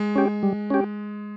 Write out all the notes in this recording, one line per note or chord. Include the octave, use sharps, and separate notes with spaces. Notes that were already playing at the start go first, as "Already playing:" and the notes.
Already playing: G#3
C#4 G4
G3
C#4 G4